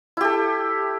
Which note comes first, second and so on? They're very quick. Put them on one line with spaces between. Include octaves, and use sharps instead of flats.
E4 G4 A4